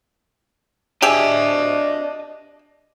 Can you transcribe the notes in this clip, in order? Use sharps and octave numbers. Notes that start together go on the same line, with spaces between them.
D4 G4 G#4 D#5 E5 A5